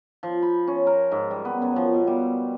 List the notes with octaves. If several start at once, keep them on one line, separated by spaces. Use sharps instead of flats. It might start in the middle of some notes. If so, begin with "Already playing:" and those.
F3
B5
C#4
A#4
G#2
G3
B3
F#2
F3
B2
G3